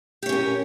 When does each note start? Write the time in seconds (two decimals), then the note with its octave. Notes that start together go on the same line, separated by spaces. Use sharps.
0.23 G4
0.26 C#5
0.29 C#4
0.32 A#4